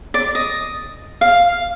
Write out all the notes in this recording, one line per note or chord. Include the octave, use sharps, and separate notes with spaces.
D5
D#5
F5